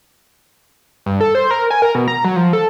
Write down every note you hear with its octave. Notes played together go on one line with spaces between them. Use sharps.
G2
A4
C5
A#4
G#5
A#4
B2
A#5
F#3
F3
A4